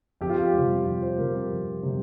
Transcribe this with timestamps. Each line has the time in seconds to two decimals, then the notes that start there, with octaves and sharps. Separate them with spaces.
0.21 F2 G4
0.30 F4
0.37 G4
0.54 C3 G3
0.85 F2 F4
1.02 C5
1.18 C3 G3 A#4
1.35 G4
1.51 F2
1.83 C3 G3